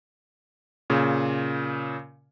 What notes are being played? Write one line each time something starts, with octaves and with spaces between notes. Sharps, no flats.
A#2 C#3